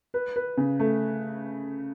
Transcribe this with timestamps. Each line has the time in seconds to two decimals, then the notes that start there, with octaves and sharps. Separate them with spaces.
0.14 B4
0.36 B4
0.57 C#3
0.80 A3